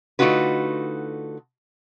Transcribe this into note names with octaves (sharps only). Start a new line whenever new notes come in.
D3 A3 D#4 F4 F#4 B4